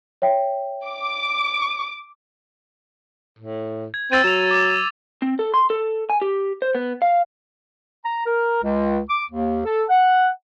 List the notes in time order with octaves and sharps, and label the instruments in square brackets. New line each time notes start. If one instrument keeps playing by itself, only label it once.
[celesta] C#5 E5 G5
[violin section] D6
[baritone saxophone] A2
[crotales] G#6
[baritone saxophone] C4 [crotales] E6 A6 D#7
[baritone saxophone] F#3 [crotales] E7 F7
[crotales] D6
[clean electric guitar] C4
A4
C6
A4
G#5
G4
C5
B3
F5
[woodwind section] A#5
A#4
C#2
D6
D#2
A4
F#5